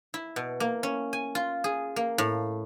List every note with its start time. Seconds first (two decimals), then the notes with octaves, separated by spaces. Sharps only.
0.14 E4
0.36 B2
0.60 A#3
0.83 C#4
1.13 G#5
1.35 F4
1.64 G#4
1.96 A#3
2.18 A2